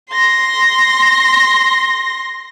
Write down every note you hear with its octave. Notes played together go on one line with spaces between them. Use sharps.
C6 A#6